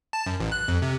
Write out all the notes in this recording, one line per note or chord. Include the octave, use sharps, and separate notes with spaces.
A5
F#2
A1
F#6
F2
C3